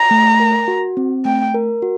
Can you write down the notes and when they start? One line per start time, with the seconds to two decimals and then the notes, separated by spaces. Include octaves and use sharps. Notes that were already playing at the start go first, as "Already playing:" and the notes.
Already playing: A#5
0.11 A3
0.40 A#4
0.68 F#4
0.97 C4
1.25 A3 G5
1.54 A#4
1.82 F#4